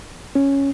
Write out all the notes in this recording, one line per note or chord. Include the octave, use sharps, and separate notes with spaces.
C#4